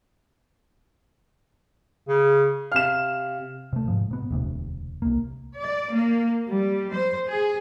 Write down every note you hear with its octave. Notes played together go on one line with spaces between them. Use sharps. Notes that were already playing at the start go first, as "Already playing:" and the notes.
C#3
C3 F5 F6 E7
C3 A3
G#2 F3
C3 B3
E1 D2 C3
C2 A#3
D5
A#3
G3
C5
G#4